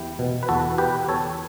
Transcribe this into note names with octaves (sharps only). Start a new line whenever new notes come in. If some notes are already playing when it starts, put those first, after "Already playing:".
Already playing: E2 E4 G4
B2
B4
E2 F#4 A4
B2 G4 B4
E2 A4 C#5